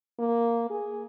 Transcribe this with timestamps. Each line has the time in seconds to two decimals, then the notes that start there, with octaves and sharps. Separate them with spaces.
0.19 A#3
0.70 G#4